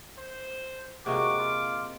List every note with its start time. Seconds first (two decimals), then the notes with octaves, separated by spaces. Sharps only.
0.18 C5
1.06 C3 G#3 A#3 F#4 D6
1.38 F4